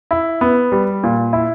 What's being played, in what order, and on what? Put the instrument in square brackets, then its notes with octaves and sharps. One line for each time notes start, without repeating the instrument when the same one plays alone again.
[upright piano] E4
B3
G3
A#2
E4